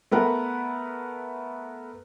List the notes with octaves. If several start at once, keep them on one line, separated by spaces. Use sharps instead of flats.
A3 B3 A#4 B4 F#5